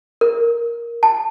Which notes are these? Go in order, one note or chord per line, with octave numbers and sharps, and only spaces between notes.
A#4
A5